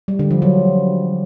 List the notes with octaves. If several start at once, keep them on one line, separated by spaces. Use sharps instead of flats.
G3
D3
F3
F#3